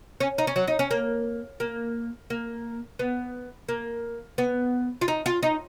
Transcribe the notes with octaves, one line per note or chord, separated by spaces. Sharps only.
C#4
D#4
C#4
F#3
D#4
C#4
A#3
A#3
A#3
B3
A#3
B3
F4
D#4
F4
D#4